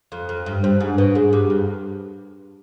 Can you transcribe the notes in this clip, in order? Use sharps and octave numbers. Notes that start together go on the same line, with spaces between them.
F2
F2
G2
G2 C5
G#2
B2 B4
G#2 G#4
G2 G4
F2